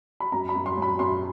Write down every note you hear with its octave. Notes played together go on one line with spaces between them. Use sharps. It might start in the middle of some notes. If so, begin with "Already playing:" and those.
B5
F#2 A#5
B5
F#2
C6
F#3
B5
F#2 C6